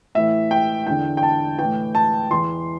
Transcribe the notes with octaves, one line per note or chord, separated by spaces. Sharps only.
A2 E3 E5
G5
E2 D3 G5
G5
A5
A2 E3 G5
A5
E2 E3 C6